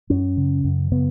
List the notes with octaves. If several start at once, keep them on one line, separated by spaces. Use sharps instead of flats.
F#2 C#4
C#3
F#2
C#3 B3